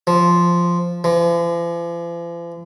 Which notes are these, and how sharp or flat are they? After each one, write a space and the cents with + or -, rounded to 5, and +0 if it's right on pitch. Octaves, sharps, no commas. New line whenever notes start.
F3 -5
F3 -45